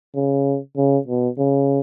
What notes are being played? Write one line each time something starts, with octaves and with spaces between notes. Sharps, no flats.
C#3
C#3
B2
C#3